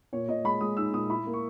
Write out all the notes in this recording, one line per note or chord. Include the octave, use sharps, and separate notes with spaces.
A#2 C#5
A#2 D#5
G#3 B5
G#3 D#6
D#4 E6
A#2 D#6
E4 B5
A#3
C#6